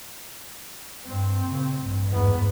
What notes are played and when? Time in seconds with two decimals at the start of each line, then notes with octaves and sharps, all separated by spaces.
1.06 G2 C4
1.43 A#2 C#3
1.79 A1 G2
2.12 E2 G#2 B3